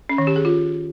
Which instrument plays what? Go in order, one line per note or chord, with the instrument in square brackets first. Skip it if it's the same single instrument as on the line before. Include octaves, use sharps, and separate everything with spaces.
[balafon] C#4
D#3
G4
G#4
F4